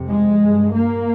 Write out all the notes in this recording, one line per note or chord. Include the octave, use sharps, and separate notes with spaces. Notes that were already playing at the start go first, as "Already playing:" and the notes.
Already playing: F2 C3
G#3
G2
A#3